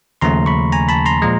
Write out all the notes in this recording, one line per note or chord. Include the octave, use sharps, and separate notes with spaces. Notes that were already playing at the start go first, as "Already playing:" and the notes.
D#2 C#3 F3 A3 C#4 A#5 C6
B5 C#6
G#5 A#5
A5 B5
A#5 C6
A#2 F3 G#3